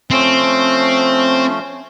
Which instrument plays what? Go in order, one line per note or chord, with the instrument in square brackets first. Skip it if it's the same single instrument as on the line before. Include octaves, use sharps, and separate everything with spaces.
[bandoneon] F3 A3 C#4 [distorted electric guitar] C4